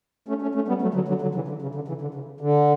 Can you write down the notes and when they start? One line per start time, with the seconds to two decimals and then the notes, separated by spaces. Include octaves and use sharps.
0.29 A3 C#4
0.42 A3 C#4
0.55 A3 C#4
0.68 G3 B3
0.82 F#3 A3
0.94 D3 F#3
1.08 D3 F#3
1.22 D3 F#3
1.35 C#3 E3
1.48 D3
1.62 C#3
1.75 D3
1.88 C#3 E3
2.01 D3
2.14 C#3
2.41 D3